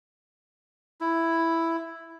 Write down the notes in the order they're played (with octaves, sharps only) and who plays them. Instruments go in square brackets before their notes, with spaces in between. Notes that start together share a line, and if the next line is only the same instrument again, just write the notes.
[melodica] E4